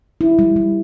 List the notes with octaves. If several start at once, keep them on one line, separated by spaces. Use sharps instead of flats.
E4
G3
G3